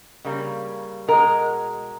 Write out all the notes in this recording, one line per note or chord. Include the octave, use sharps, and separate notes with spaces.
C#3 G3 A#3
B2 G#3 A#4